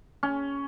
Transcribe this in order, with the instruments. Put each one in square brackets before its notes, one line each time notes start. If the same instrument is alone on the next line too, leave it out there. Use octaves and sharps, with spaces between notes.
[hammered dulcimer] C#4